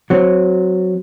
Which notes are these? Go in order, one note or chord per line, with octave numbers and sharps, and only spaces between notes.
F#3 C4